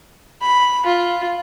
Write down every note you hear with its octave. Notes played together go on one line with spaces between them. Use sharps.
B5
F4